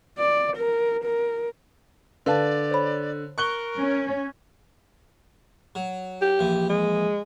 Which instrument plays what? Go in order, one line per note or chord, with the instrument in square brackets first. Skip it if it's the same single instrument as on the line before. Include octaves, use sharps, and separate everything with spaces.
[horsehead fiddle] D5
A#4
A#4
[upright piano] D3 [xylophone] B4 F5 A5 [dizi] D5
[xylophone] C5 C#5 B5
[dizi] A#4 [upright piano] C#6 F#6 G7
[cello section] C#4
[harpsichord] F#3
[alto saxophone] G4
[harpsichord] A#1 E3
[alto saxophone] G#3